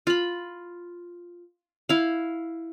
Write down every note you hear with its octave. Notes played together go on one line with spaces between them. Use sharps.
F4 B5
E4 F5